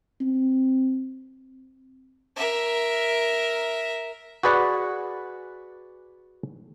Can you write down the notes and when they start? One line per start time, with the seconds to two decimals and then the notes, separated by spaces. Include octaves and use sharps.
0.21 C4
2.36 A#4 E5
4.43 F#4 G#4 B4 D5 F#5